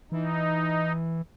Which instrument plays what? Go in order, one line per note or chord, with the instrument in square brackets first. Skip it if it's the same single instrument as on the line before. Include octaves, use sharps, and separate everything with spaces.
[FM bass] E3 [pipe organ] D#4